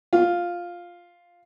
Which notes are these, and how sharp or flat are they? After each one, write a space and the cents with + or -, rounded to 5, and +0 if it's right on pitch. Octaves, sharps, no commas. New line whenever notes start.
F4 +5